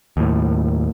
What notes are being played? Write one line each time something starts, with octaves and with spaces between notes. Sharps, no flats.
D#2 A2